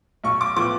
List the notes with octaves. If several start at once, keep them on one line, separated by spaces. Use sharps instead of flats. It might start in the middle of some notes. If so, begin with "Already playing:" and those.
B1 C#6
D6
A2 F3 B3 D6